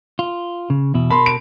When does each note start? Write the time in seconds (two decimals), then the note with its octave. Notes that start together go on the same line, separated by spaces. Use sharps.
0.19 F4
0.70 C#3
0.94 E2 B2 E4
1.10 B2 A#4 A5 B5 C6
1.26 D7